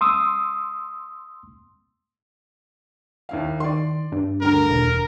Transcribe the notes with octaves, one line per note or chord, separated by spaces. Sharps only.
C6 D#6 E6
D#2 E4 F5
D#3 D5 C6
G2
D2 D3 A#4
E1